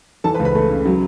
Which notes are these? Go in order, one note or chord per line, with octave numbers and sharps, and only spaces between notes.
E3 A4 A5
B4 B5
C#2
B4 B5
A3
C#3
F#3